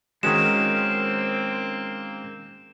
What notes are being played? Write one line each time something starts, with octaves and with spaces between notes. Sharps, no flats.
D#3 G#3 A#3 C4 C#4 F#4 E7